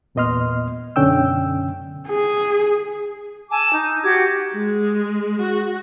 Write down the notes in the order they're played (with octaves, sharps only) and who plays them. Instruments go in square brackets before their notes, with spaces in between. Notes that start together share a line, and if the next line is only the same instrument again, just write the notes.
[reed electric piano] E2 A#2 B3 D#5 C6 F6
F#2 B2 D3 C#4 G5 E6
[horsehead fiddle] G#4
[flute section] G#5 A5 D6 E6
D#4
F#4 G4 D6 G#6
[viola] G#3
F#4